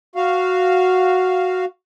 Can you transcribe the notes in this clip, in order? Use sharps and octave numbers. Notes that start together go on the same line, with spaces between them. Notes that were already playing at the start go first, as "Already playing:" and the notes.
F#4 F5